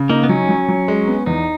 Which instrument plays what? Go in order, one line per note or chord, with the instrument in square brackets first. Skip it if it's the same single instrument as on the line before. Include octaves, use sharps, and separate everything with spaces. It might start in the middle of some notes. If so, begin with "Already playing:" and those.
Already playing: [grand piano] C#3
[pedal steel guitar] A#3 [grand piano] D#4
[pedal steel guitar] B3
[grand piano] F#3 [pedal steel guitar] C#4
[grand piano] F#3
F#3
G#3
B3
[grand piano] E2 [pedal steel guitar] D#4